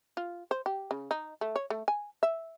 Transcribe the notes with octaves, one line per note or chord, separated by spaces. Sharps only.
F4
C5
G4
C#3
D#4
A3
C#5
A3
G#5
E5